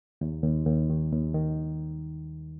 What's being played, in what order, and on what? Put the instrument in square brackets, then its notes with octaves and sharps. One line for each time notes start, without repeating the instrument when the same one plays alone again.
[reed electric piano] D#2
D#2
D#2
D#3
D#2
D#3